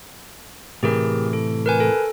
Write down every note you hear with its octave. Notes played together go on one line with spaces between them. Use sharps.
A2 C3 E3 G4 G#4 A#4
A4
A#4 B4 G#5
A4